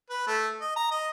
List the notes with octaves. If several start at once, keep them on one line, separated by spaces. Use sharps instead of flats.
B4
A3
D#5
A#5
D#5